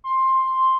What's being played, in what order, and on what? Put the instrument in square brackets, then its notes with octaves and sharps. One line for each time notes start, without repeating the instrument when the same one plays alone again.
[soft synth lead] C6